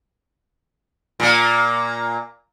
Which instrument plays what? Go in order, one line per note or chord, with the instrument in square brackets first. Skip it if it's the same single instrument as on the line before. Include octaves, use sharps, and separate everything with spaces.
[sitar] A#2 A#3